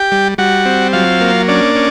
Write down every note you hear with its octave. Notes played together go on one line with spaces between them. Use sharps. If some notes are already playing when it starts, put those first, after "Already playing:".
Already playing: G4 G5
G3
G3 F#4 F#5
C4
F#3 F4 F5
A#3
C#4 D4 D5
C#4